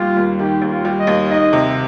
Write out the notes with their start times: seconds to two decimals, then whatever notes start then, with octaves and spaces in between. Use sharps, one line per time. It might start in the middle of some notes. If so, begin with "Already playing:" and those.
Already playing: D#2 G3 F4
0.17 D#2
0.39 D#3 G4
0.61 D#2
0.70 F4
0.85 G3
1.00 D#5
1.07 D#2
1.30 D#3 D#5
1.53 C3